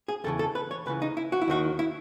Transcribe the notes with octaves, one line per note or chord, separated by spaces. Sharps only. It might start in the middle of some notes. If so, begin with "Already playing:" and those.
G#4
E2 C#3 E3 A4
A4
B4
C#5
C#2 C#3 E3 B4
D#4
E4
F#4
E4
D#2 D#3 F#4
E4